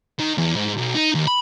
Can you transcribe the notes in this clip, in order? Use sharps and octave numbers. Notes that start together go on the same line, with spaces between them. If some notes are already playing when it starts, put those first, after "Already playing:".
D#3
E2
G#2
B1
D#4
D#2
B5